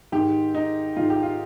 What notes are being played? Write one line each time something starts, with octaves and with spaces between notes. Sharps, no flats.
G#2 D#3 G4
D#4
G#2 D#3 F4
G4
F4